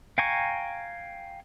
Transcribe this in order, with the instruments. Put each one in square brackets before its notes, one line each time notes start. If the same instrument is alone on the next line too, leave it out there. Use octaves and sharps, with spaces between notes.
[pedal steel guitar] F5 G5 G#5 A#5 C#6